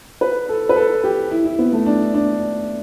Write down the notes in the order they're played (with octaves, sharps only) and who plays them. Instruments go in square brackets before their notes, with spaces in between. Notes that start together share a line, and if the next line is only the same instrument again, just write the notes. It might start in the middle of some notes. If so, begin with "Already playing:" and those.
[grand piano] B4
A4
B4
A4
G4
E4
E4
B3
A3
D4
D4